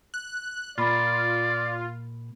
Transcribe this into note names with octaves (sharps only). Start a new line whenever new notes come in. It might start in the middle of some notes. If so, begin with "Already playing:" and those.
F#6
A#2 F4 D5 B5